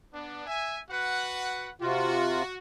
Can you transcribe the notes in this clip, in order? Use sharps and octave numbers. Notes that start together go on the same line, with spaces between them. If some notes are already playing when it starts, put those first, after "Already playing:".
B3 D4
E5 G#5
F#4 B4 F#5
C3 F4 F#4